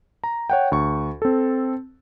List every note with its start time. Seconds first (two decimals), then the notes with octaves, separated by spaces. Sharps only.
0.24 A#5
0.50 C#5 F#5 G5
0.72 D2 C#6
1.22 C4 A4